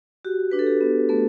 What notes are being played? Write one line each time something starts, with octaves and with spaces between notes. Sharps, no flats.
F#4 G4
D4 B4
A4
G4
B3
A3 B3 A4